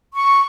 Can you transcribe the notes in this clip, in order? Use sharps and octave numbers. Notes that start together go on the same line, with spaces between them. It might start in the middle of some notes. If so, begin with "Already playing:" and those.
C#6